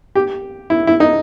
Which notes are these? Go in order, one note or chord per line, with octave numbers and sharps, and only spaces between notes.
G4
E4
E4
D#4